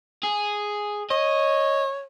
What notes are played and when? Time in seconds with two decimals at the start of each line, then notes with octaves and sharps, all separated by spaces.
0.24 G#4
1.11 C#5 D#5